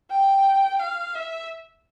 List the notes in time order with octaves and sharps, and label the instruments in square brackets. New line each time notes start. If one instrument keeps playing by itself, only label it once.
[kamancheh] G5
F5
E5